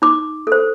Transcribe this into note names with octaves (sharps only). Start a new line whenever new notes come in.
D#4 D6
A4 C5